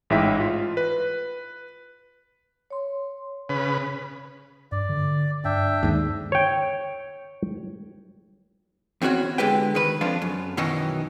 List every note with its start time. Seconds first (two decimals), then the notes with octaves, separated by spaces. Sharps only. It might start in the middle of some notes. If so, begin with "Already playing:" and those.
0.10 A1 G#2 E4 E5 G5 B6
0.40 F4
0.77 B4
2.70 C#5 C6
3.49 C#3 B4
4.72 G2 D5
4.89 D3
5.45 G2 D4 E5 G5
5.83 D#2 G#2
6.32 C#5 G5
9.02 E2 C4 C#4 F#4 C#5
9.38 D3 G#3 G4 B4 G5
9.75 D#3 B4
10.01 F2 F3 D4 F4
10.22 F#2
10.57 F#2 B2 D#3 E3 C#4 D#4